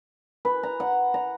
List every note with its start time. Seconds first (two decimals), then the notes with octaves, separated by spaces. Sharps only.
0.45 B4
0.63 A#5
0.80 F#5
1.14 A#5